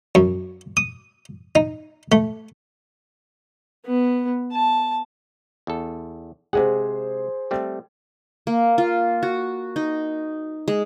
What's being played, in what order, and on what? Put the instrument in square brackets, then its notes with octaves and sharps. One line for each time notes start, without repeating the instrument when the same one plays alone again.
[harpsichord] F#2
D#6
D#4
A3
[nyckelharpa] B3
A5
[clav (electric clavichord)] E2 A4
[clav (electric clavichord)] C3 G#3 F#5 [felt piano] G#4 C5
[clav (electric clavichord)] G3 A3 C4
[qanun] A#3
F4
F#4
D#4
G#3